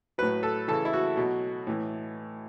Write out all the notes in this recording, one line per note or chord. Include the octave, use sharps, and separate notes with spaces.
A2 F#3 B4
A4
C#3 E3 A4
E4
F#4
B2 F#3
A2 E3